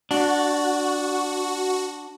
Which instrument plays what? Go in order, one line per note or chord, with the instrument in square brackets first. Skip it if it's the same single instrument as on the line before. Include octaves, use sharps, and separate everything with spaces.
[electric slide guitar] D4 [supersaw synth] F#4